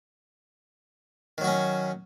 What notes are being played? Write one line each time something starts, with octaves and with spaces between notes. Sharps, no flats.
D#3 F#3 C#4 F#4